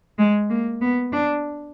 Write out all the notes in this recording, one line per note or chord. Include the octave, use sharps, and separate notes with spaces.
G#3
A#3
B3
D4